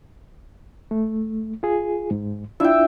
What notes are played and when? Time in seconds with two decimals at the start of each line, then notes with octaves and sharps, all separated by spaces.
0.91 A3
1.63 F4 G#4
2.11 G#2
2.60 D4 E4 F4 E5 G5